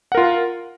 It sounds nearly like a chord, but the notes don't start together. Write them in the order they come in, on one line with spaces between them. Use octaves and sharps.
F#5 A#4 F4